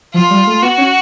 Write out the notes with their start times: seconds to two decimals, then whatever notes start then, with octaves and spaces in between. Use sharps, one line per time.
0.14 F3 F4
0.30 G3
0.47 A3
0.62 B3 F#4
0.78 C#4